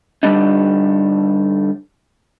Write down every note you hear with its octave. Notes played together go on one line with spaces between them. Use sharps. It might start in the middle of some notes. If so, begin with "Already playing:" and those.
G2 D3 G3 D4 D#4